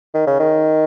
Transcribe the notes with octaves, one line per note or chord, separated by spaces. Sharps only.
D#3
C#3
D#3